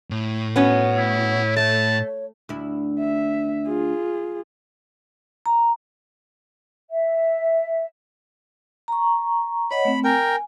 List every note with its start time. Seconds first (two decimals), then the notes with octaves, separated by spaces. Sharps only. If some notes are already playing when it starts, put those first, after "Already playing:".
0.11 A2
0.56 B3 C#4 F#4 C#5
0.97 E4
1.56 A3 A5
2.49 D2 E4
2.99 E5
3.67 F4 G#4
5.46 A#5
6.89 E5
8.88 A#5 C#6
9.71 C#5 D#5 F#5 B5
9.85 A3 C4
10.04 A#4 G5 G#5